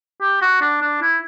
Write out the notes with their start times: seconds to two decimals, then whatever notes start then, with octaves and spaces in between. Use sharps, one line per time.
0.22 G4
0.42 F#4
0.61 D4
0.82 D4
1.02 E4